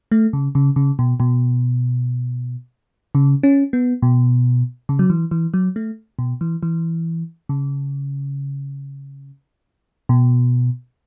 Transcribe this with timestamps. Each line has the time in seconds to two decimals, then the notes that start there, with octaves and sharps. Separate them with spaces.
0.12 A3
0.33 C#3
0.55 C#3
0.76 C#3
0.99 B2
1.20 B2
3.15 C#3
3.43 C#4
3.73 B3
4.02 B2
4.89 C#3
4.99 F#3
5.10 E3
5.31 E3
5.54 F#3
5.76 A3
6.19 B2
6.41 E3
6.63 E3
7.49 C#3
10.09 B2